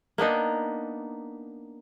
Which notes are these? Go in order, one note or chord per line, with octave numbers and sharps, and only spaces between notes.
A#3 B3 D4 D#4